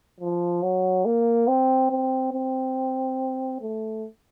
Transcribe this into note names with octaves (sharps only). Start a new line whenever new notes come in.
F3
F#3
A#3
C4
C4
C4
A3